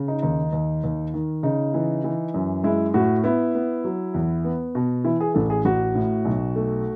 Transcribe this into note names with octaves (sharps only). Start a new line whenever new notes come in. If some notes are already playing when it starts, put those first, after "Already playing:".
Already playing: C#3
D#4
D#2 D#4
D#2
D#2
D#3
C#3 D#4
E3
E3
F#2
G#3 E4
A2 F#4
B3 E4
B3
F#3
E2
B3
B2
E3 E4
G#4
A1 A4
G#4
A1 F#4
A2
B1
A3